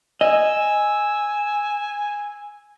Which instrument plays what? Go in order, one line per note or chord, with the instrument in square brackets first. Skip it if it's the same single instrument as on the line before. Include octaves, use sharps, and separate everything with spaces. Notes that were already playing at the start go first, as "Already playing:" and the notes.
[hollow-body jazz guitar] D#5 [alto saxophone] G#5 [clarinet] E6